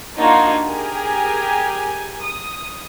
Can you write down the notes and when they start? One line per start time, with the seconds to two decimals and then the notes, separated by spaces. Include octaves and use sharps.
0.18 A#3 D4 D#4 F4 F#4 G#6
0.66 G4 G#4 A#4 G#5
2.23 D#6